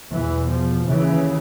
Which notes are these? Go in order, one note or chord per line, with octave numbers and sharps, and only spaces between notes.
E2 B2 E3
F3
D#2 C#3 E3